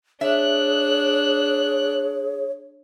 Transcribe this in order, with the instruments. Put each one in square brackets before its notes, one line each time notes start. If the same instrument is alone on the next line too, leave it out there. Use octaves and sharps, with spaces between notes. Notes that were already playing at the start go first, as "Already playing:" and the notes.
[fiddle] D4 F#6 [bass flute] G#4 [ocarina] C#5 [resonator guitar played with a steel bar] E5